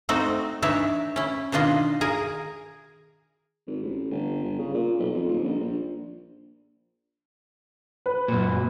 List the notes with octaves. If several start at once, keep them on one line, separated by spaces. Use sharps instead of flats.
A3 C4 D#4 F#4 A4
E3 D4 D#4 C#5 E5
C#4 E4
B2 D#3 D4 F4 D#5
G#4 A#4 G#5
G#1
A1
G1
G1
C#3
A#2
B1
F2
D#1
A#1
A#1
B4
F#2 A#2